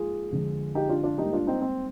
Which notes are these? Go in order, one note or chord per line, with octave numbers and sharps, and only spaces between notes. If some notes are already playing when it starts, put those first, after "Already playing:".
Already playing: G#2 F3 A#3 F4 G#4
F2 D3 G#3
D#4 G4
D4 F4
D4 F4
G#2 G3 A#3 D#4 G4
D4 F4
C4 D#4
C4